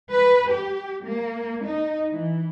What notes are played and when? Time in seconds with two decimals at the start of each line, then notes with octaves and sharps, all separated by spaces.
0.12 B4
0.51 G4
1.07 A#3
1.65 D#4
2.11 E3